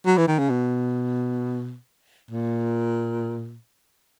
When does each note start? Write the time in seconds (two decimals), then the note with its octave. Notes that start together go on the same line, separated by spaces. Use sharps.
0.06 F#3
0.18 E3
0.28 D#3
0.39 C#3
0.50 B2
2.31 A#2